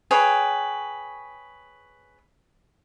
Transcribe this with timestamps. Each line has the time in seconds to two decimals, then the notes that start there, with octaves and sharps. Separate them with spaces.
0.11 G#4 B4 C#5 G5